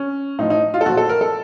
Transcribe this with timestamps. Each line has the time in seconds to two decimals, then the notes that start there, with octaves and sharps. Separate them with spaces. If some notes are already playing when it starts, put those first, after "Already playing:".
Already playing: C#4
0.39 A2 D#4
0.43 F3
0.50 D#4
0.74 F4
0.81 A4
0.86 A#2 F3 F#4
0.97 A4
1.09 A#4
1.21 A4